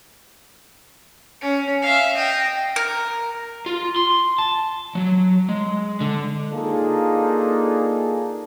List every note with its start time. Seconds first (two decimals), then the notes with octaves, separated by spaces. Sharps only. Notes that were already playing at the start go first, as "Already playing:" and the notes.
1.41 C#4
1.82 E5 F5
2.15 D#5 G5
2.76 A#4
3.66 F4
3.96 C6
4.38 A5
4.95 F#3
5.49 G#3
6.01 D3
6.51 A#3 D4 D#4 F4 G#4 A4